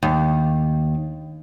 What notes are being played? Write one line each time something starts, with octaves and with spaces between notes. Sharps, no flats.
D#2